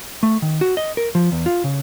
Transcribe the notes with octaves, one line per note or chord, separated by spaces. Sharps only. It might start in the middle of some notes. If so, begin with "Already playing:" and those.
A3
D#3
F#4
D#5
A#4
F3
E2
F4
C#3